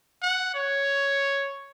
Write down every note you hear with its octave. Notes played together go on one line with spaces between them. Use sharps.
F#5
C#5